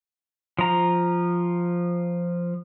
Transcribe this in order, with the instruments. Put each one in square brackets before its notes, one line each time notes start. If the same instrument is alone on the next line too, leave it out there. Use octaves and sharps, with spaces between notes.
[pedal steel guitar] F3 A#5